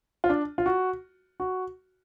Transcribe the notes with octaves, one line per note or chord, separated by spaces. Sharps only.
F4
D4
F4
F#4
F#4